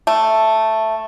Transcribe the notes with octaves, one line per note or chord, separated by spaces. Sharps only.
A3